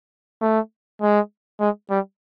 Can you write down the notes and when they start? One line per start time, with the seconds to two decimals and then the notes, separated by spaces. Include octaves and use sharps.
0.42 A3
1.02 G#3
1.60 G#3
1.90 G3